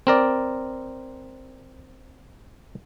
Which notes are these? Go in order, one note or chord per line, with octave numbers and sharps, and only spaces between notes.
C4 A#4 D5